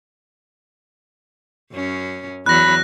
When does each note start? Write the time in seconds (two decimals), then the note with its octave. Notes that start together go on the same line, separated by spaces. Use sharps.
1.72 F#2 C#4
2.46 E2 F#3 B5 F#6 A#6